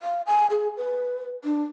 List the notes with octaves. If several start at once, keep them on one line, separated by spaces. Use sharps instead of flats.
F5
G#5
G#4
B4
D4